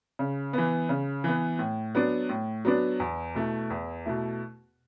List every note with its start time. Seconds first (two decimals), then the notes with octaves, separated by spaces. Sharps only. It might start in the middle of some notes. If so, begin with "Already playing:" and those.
0.19 C#3
0.53 E3 B3
0.89 C#3
1.24 E3 B3
1.59 A2
1.95 F#3 B3 D4
2.29 A2
2.65 F#3 B3 D4
3.00 E2
3.35 B2 A3 E4
3.70 E2
4.06 B2 A3 E4